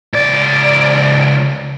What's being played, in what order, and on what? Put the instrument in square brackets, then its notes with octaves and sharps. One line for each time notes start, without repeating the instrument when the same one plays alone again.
[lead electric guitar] C#2 D5